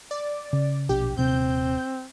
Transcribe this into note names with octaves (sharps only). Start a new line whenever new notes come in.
D5
C#3
A#1 B2 D4 G4
D#1 C3 C4 G6